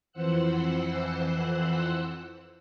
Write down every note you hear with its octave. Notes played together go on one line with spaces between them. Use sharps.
F2 E3 C5 F#5 E6 F#6